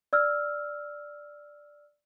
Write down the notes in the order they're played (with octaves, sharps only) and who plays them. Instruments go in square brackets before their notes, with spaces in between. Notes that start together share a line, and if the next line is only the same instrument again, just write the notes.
[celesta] D5 E6 F6